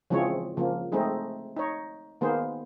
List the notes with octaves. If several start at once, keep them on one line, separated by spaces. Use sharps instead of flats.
C#3 E3 F3 G#3 C4 C#5
C#3 F3 A#3
G#3 A3 C4 D#4 G#4
D#4 C#5
D#3 A#3 B3 G#4 C5